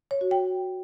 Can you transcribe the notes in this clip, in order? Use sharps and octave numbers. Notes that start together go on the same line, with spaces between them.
C#5
F#4
G5